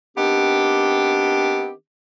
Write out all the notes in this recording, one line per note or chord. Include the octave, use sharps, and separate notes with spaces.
D#3 B3 C4 D4 G4